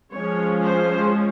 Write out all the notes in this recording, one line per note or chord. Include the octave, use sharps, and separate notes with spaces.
F3 G#3 C#4 C#5
C5